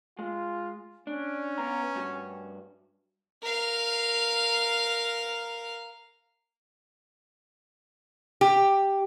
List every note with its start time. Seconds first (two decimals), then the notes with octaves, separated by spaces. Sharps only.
0.19 G#3 F4
1.07 C#4 D4
1.58 B3 A#5
1.95 G2 F#4
3.43 A#4 F5
8.41 G4